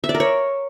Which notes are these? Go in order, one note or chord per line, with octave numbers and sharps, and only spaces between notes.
E5
D5
A#4
C#5